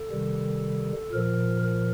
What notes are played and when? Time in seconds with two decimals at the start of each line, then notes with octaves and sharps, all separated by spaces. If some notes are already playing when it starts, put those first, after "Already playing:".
Already playing: A4
0.11 C3 D#3 G3
1.12 A#2 F3 A#4
1.62 A#4